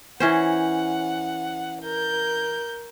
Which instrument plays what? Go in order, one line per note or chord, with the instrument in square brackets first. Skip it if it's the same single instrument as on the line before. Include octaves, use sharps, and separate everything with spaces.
[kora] E3 C#4 C5 [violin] F#5
[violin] A#4 G6